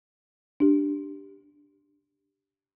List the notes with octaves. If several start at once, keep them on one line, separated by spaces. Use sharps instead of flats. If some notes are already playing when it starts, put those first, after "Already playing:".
D4 G4